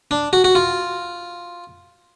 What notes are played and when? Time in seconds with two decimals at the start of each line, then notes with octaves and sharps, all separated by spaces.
0.11 D4
0.33 F#4
0.44 F#4
0.55 F4